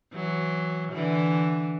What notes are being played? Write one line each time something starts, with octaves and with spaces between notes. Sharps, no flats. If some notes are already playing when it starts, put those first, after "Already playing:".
E3 F#3
D3 E3